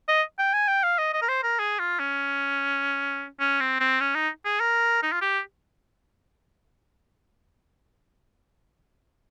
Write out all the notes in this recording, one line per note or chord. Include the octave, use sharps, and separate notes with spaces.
D#5
G5
G#5
G5
F5
D#5
D#5
A#4
C5
A#4
G#4
F4
C#4
C#4
C4
C4
C#4
D#4
G#4
A#4
D#4
F4
G4